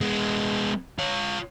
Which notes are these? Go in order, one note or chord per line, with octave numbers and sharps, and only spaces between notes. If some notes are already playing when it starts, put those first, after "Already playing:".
G#3 B3
F4 C#5